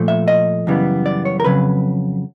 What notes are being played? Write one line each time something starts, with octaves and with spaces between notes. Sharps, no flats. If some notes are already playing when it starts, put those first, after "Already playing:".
Already playing: A#2 F3 A3
E5
D#5
F#2 C#3 E3 G3 B3
D5
C#5
A#4
F2 C#3 F#3 B4